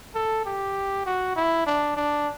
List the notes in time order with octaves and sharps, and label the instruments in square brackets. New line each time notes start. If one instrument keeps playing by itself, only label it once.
[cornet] A4
G4
F#4
E4
D4
D4